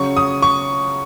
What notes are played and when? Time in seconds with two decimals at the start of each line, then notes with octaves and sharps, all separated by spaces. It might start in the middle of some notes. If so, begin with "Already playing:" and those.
Already playing: C#3 F#3 C#6
0.17 D#6
0.42 C#6